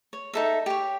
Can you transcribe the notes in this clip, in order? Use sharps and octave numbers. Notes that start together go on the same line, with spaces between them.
C#5
D#4 A4 E5
G4 C#5